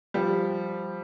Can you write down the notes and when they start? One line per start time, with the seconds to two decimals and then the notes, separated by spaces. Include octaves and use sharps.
0.14 F3 G3